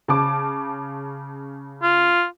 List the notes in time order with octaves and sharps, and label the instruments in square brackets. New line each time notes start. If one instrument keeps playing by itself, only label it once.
[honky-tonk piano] C#3 A5 D6
[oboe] F4